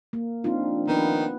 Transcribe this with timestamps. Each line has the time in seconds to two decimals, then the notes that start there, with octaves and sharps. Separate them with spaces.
0.13 A#3
0.44 F3 C4 D4 D#4 F4
0.87 D#3 B3 B4